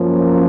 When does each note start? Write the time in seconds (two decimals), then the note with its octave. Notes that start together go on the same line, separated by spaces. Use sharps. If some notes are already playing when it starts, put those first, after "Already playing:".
Already playing: F#2 F3 A#3 C#4